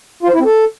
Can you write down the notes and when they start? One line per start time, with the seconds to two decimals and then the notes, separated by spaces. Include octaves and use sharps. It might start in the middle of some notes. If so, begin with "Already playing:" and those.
0.23 F4
0.28 C5
0.34 E4
0.40 C4
0.45 A4